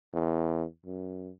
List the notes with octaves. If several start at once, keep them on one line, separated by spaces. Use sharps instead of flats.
E2
F#2